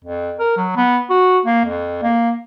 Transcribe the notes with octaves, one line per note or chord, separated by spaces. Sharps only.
F2
A#4
F#3
B3
F#4
A#3
F2
A#3